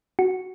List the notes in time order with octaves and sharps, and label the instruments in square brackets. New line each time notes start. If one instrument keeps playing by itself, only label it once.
[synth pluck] F#4